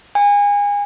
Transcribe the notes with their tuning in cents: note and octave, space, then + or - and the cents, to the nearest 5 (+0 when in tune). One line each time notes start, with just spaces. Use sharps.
G#5 -30